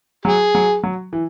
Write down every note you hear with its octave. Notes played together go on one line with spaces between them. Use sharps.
F#3 G#4
F#3
F#3
E3